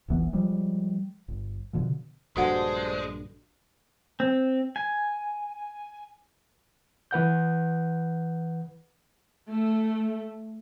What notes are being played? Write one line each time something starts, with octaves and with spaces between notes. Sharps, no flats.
D#1 G#1 E3 B3
F3 G3 G#3
G1
B2 D3 F3
A#1 G2 D3 G#3 D4 F#4 C5 F#5
C4
G#5
E3 B4 F#5 G6
A3